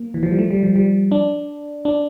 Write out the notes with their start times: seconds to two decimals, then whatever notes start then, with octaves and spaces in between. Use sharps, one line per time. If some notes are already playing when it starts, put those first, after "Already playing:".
Already playing: A#3
0.14 E3
0.23 F3
0.31 G3
0.39 A3
0.51 G3
0.63 F3
0.76 G3
1.12 D4
1.85 D4